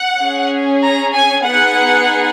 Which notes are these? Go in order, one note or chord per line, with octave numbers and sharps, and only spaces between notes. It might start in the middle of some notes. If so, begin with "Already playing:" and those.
Already playing: F#5
C#4 G#4
A#5
G#5
B3 D#4 G#4 F#5